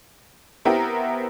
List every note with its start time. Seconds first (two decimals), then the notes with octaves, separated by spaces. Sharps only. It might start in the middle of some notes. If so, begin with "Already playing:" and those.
0.65 B3 C4 E4 G4 A#4